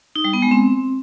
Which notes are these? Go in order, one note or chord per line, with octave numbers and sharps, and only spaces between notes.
D#4
G3
B3
G#3
C4